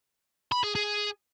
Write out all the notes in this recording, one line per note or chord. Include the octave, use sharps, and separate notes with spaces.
B5
G#4
G#4